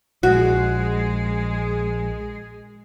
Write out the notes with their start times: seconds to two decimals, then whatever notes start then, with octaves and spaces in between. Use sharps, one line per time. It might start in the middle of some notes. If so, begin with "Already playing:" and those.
0.23 A#1 G#3 F#4 G#4